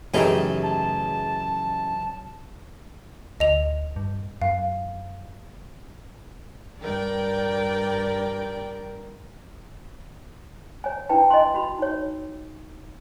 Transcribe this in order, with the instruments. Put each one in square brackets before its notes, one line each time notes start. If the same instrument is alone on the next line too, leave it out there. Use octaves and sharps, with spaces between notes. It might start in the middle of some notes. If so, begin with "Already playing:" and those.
[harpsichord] F#2 E3 D#4 [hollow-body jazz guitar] C#3 G5 [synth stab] A3 G4 G#4
[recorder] A5
[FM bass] D2 [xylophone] D#5 F7
[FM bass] G2
[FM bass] F#2 [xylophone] F5
[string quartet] G2 A#4 [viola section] D5 G5
[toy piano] C#5 G#5
D4 E4 B4 G5 A5
D#5 G#5 C6
F#4 B5 C6
D#4 C#5